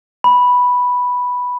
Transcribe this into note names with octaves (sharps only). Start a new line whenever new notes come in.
B5